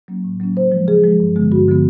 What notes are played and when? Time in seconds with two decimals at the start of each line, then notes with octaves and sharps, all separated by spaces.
0.08 F#3 A#3 C#4
0.24 A2
0.40 F#3 A#3 C#4
0.57 C#3 C5
0.72 F3 G#3
0.88 C#3 G#4
1.03 F3 G#3
1.20 G2
1.36 D3 F3 G#3 B3
1.52 G2 F#4
1.68 D3 F3 G#3 B3